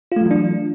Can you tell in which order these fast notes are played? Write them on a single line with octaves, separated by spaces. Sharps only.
F4 A3 F#3 E3 D4